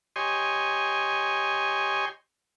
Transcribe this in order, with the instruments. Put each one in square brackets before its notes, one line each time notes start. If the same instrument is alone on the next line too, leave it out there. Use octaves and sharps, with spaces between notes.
[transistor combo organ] G4 C#5 D#5 G#5 C6